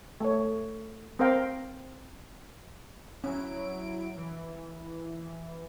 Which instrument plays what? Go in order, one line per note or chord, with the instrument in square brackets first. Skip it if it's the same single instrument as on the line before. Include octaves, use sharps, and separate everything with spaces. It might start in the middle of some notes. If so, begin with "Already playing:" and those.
[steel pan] A3 C#5
C4 A#4 C5 F5 G5 A#5
[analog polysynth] F#3 E4 D7 [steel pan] C#4
[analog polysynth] E3